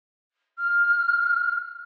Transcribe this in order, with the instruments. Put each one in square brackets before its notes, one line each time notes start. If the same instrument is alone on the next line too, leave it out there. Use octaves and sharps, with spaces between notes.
[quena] F6